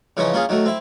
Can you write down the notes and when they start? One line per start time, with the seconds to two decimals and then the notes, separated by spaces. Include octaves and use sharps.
0.17 C#3 E3 F3 C#4 D#4
0.33 A#3 C#4 F4 G#4
0.49 D#3 F#3 A3
0.65 C4 E4